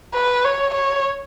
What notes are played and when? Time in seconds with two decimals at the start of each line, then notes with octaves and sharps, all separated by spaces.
0.14 B4
0.44 C#5
0.74 C#5